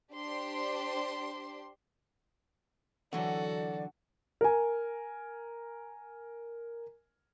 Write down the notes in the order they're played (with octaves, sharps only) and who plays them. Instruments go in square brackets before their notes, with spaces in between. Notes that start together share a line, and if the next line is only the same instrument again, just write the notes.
[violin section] D4 G4 C5 C6
[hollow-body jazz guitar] D3 E3 F#3 [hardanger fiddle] F#4 A4 [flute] D5 [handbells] F#5
[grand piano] A#4 G#5